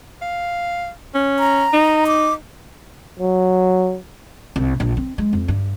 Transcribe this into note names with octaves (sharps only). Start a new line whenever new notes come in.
F5
C#4
A#5
D#4
D6
F#3
C2
A#1
C4
G#3
F2
G2